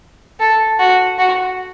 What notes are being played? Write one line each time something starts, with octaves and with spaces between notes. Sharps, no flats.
A4
F#4
F#4